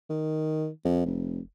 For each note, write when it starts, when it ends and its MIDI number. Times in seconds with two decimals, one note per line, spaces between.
0.10 0.68 51
0.85 1.04 41
1.06 1.40 29